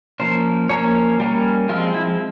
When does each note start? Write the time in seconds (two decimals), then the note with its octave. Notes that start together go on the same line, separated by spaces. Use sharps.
0.20 F3 A#3 C#4 C5
0.69 F3 A#3 C#4 C#5
1.20 G3 A#3 C#4
1.69 F3 G#3 C4 F4
1.94 E4